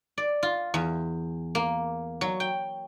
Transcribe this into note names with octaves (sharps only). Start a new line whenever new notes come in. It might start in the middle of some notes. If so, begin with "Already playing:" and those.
D5
F4
E2
A#3
F#3
G5